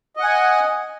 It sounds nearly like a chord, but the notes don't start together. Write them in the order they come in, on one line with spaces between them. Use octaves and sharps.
D#5 F#5 G#5